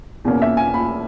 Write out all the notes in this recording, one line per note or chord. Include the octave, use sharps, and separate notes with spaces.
E2 B2 A#3 C#4
E5
G#5
B5